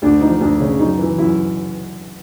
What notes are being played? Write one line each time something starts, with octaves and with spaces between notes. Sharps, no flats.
D2 D4
F3 D#4
D2 D4
C#3 C#4
F#2 D#4
E3
F#2 E4